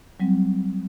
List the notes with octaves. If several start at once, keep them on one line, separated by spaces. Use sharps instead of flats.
F#3 G3 C4